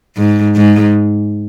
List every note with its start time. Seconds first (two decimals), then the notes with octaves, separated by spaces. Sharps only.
0.17 G#2
0.56 G#2